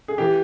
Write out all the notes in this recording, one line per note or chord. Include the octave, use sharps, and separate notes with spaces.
G#4
E3 G4